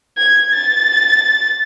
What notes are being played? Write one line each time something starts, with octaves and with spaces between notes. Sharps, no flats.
G#6
A6